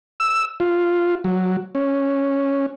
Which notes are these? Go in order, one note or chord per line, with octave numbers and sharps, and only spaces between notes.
E6
F4
F#3
C#4